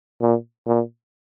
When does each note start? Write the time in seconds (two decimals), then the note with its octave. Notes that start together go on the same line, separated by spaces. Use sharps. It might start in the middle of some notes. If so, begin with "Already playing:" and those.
0.21 A#2
0.67 A#2